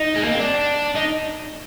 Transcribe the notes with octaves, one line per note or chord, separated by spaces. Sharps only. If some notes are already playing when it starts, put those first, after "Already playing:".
Already playing: D#4
G#3
A#3
C4
D4
D#4